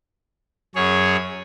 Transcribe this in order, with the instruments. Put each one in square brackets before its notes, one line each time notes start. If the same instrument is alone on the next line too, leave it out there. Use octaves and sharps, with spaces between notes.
[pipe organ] F#2 G#4 C#5